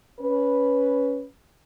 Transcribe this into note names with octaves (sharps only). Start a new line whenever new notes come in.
C#4 B4